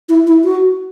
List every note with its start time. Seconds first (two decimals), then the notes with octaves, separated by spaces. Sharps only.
0.09 E4
0.27 E4
0.44 F#4